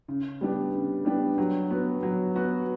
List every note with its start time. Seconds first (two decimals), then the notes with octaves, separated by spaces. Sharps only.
0.08 C#3
0.41 G3 B3 D4 G4
0.73 C#3
1.05 G3 B3 D4 G4
1.38 F#3
1.71 B3 F#4
2.03 F#3
2.35 B3 F#4